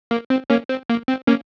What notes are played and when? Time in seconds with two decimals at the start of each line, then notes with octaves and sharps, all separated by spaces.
0.11 A#3
0.30 C4
0.50 A#3 C#4
0.69 C4
0.90 A#3
1.08 C4
1.27 A#3 C#4